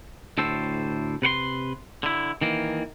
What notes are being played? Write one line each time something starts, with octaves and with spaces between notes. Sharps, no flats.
D2 A2 A4 C5
C3 B4 F#5 C6
D3 E4
D#3 E3 A#3